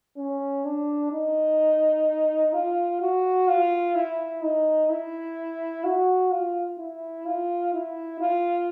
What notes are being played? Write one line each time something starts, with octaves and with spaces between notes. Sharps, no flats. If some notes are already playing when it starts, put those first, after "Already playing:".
C#4
D4
D#4
F4
F#4
F4
E4
D#4
E4
F#4
F4
E4
F4
E4
F4